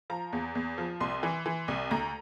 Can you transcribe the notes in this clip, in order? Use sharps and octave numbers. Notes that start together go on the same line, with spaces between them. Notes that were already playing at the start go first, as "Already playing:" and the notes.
F3 A#5
E2
E2
F3
C2 C6
E3
E3
C2
D2 A#5